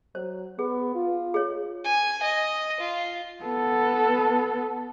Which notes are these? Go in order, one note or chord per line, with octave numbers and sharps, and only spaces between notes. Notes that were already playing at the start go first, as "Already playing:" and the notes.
F#3 C5
B3 G#4
F4
G#4 C#5
G#5
D#5
F4
B3 A4